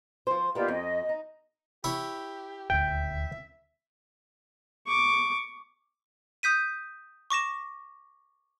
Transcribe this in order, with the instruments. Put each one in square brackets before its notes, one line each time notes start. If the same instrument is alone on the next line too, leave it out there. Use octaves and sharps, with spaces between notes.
[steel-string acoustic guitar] F3 C5
[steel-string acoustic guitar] D#3 A#3 B3 [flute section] F4 G4 D5
[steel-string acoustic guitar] F2 [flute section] D#5
[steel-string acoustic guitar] D#4
[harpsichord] E4 C#5 [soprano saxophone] G4
[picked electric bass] D#1 D2 [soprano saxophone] E5 [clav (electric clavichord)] G5
[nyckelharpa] C#6 D6
[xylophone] D#6 G6 B6 D#7
C#6 D6 A#6 E7